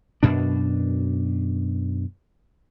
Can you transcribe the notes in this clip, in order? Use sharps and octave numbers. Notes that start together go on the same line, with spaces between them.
F#2 B2 D4